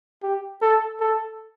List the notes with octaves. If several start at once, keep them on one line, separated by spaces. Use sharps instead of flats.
G4
A4
A4